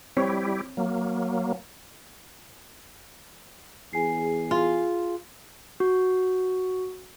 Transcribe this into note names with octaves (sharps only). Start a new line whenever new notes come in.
G3 C4 E4 G4 C#5
F#3 A#3
E2 G#4 G#5 C7
F4
F#4